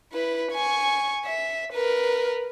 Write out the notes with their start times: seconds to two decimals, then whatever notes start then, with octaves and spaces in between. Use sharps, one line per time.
0.12 E4 B4
0.52 G#5 C#6
1.25 E5
1.73 A#4 B4